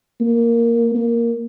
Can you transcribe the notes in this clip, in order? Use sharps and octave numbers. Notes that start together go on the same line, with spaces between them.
A#3
A#3